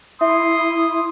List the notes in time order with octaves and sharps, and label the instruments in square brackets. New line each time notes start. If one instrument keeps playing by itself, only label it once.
[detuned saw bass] E4 [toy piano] E5 [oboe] C6 [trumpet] D#6